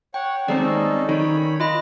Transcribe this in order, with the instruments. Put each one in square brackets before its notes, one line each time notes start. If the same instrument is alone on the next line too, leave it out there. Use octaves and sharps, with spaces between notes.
[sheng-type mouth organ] C#5 F#5 [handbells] G5
[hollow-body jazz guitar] D#2 G#3 C4 [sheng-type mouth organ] C#4 D#4 A4 [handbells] D5
[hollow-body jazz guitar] D#3 [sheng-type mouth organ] C#5 B5
[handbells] F4 D#5 B5